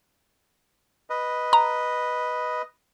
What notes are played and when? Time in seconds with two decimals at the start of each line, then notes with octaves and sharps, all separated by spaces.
1.10 B4 D#5
1.53 A#5